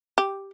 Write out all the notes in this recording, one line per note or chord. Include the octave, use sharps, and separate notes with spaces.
G4